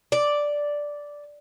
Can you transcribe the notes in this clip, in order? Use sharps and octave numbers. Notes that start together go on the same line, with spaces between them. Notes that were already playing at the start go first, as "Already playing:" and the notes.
D5